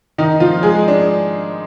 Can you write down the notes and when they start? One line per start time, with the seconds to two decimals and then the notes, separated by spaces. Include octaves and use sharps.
0.18 D#3 D#4
0.40 F3 F4
0.63 G#3 G#4
0.88 D4